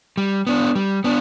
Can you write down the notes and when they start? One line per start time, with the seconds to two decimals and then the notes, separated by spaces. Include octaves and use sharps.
0.17 G3
0.47 B3 D4
0.75 G3
1.04 B3 D4